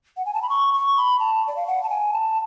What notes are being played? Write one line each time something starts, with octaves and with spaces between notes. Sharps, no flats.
F#5
G#5
A5
B5
C#6
C#6
B5
A5
D5
F5
F#5
A5
G#5
A5